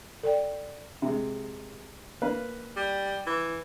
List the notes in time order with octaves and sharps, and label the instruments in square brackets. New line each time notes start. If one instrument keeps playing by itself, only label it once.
[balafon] A4 D5 G5
[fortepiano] C3 G#3
A#3 B4 F5
[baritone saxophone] G3
E3